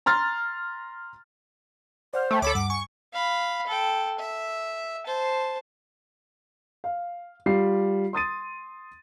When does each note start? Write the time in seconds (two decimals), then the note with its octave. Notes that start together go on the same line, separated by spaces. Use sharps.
0.06 A#5 C6 F6 A6
2.14 C5 D5 F#5 F6
2.31 A3 G5 B5
2.42 D2 A4 C#5 B5 D6
2.55 G2 F#5 D6
2.70 G#5 C#6
3.13 F5 B5
3.67 A4 G5
4.19 E5
5.07 C5 A5
6.84 F5
7.46 G3 F4 C7
8.13 C6 D#6 A6 D#7